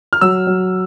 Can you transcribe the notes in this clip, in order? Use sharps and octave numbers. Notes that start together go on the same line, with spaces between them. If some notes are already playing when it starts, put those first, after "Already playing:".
F6
F#3 E6
F#3